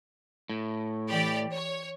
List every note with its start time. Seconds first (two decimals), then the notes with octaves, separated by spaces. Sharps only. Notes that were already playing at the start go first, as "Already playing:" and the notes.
0.49 A2
1.10 E3 G4 D5
1.52 C#5